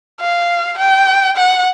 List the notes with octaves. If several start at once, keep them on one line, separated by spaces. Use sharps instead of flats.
F5
G5
F#5